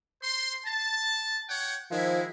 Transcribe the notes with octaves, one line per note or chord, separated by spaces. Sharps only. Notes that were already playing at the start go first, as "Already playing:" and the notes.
C5 C6
A5
C#5 F#5 G5
D#3 F3 G#3 E4